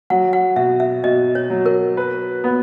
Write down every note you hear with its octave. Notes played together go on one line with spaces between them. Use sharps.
F#3 F#5
F#5
B2 E5
E5
B2 D#5
C#5
F#3
A#4
B4
B3